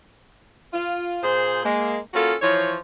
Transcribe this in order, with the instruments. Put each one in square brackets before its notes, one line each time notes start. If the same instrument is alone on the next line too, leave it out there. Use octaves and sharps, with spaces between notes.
[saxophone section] F4
A#2 G#4 C5
G#3 A#3
A#3 C#4 F4 F#4 A4
E3 F3 C5 C#5